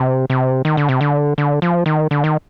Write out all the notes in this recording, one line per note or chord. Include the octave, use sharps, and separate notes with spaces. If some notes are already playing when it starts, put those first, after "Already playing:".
Already playing: C3
C3
D#3
D3
C3
D3
D3
F3
D#3
D3
D#3